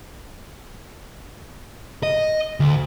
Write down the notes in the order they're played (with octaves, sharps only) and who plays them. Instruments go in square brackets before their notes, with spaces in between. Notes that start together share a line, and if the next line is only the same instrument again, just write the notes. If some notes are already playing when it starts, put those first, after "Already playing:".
[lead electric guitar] D#5
D2